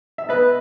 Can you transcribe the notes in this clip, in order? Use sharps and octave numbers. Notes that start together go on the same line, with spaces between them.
E5
B3 B4 D#5